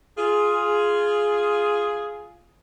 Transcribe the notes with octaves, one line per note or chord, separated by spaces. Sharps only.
F4 G#4